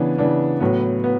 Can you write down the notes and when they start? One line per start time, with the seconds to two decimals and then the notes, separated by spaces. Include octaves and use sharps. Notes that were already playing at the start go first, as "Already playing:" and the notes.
Already playing: C#3 E3 B3 D4
0.18 C#3 E3 B3 D4
0.60 A2 F#3 B3
1.04 B3